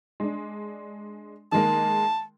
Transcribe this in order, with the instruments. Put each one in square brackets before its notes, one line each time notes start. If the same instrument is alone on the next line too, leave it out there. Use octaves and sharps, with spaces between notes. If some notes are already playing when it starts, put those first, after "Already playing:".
[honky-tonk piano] G#3 D4
[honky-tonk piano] D#3 G#3 A#3 [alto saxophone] A5